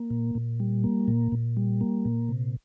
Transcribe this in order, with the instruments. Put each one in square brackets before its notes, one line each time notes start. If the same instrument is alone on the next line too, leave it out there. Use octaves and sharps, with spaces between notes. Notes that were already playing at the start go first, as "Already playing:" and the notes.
Already playing: [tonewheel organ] A#3
A#2
A#2
G3
A#3
A#2
A#2
G3
A#3
A#2
C3